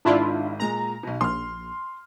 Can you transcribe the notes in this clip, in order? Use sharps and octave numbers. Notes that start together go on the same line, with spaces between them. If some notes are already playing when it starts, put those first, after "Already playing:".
G#1 G#2 D4 E4 F4
A#2 G#3 A#5
B1 B2
A#1 C6 F6